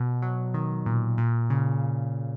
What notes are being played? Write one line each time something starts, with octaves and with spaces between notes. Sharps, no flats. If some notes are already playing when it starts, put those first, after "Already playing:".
Already playing: B2
F#3
D#3
A#2
A#2
C#3